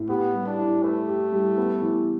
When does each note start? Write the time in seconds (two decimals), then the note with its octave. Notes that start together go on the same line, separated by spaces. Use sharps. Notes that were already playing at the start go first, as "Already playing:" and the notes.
Already playing: A2
0.09 B3 G4
0.34 G3
0.46 D4
0.59 E4
0.83 A3 B4
1.08 G4
1.32 G3
1.58 B3
1.82 E3